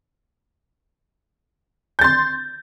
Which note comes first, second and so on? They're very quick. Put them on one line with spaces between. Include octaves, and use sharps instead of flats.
G6 A6 C6